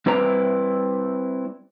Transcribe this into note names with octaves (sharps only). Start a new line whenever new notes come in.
G3 C4 E4 B4 D5 A#5